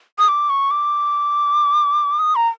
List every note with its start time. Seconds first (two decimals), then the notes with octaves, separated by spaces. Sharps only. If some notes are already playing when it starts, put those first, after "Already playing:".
0.19 D#6
0.28 D6
0.50 C#6
0.71 D6
2.19 D#6
2.36 A#5